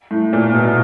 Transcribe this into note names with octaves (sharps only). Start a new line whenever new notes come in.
A2
A#2
B2